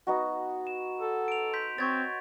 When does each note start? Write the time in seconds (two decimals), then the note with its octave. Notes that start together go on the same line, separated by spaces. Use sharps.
0.07 B3 D#4 F#4
0.67 E7
1.00 A4
1.28 D7 F7
1.53 C6 G6 B6
1.78 C4 C#5 C#6 G#6 A6